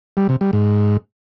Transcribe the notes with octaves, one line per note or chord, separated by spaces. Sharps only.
G3
C3
G3
G#2